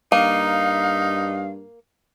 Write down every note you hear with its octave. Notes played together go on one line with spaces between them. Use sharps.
G2 A#3 D#4 F5